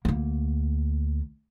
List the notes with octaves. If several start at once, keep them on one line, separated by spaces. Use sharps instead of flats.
D2 A#3